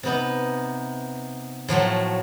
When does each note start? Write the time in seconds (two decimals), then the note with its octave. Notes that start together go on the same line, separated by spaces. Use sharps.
0.03 C3 B3 D#4
1.68 A2 F3 F#3 A3